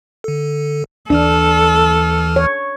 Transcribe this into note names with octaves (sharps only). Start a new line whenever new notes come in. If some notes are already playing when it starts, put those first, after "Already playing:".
D3 A4
D#2 E3 D4 A4 F6
C#5